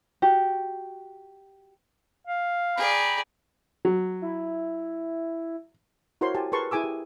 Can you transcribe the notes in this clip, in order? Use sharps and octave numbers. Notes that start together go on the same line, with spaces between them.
F#4 G4
F5
G#4 D5 G5 A#5 B5
F#3
E4
E4 F#4 A#4 C5 C#5 C6
G4 G#5 A5
G#4 A#4 B4 A5 C6 C#6
E4 G#4 G#5 D6 E6
G4